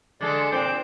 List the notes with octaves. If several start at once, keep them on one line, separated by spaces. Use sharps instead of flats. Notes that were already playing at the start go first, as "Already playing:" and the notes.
D3 G#3 A4 D5
A#2 C4 D6 G6